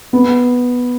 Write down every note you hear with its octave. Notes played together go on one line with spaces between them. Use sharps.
B3